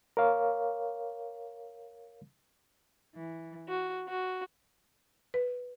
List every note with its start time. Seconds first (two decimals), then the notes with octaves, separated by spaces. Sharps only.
0.17 A#4 C#5 F5
3.16 E3
3.69 F#4
4.09 F#4
5.34 B4